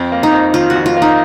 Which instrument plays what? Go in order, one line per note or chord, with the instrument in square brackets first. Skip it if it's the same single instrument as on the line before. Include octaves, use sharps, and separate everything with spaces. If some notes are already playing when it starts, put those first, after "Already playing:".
Already playing: [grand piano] F2 [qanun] C4
[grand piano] A#3
[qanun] D#4
[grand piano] F2
[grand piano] D#3 [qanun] F4
[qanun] F#4
[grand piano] F2
[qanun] F4
[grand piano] A#3
[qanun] D#4